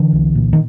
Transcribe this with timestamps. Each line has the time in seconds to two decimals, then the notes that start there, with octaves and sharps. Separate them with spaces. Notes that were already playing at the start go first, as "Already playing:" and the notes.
Already playing: D3 E3
0.13 C2
0.35 A#2
0.53 D#3